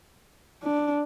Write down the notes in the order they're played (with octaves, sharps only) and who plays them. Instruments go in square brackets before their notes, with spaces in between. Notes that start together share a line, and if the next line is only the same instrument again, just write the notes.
[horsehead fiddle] D4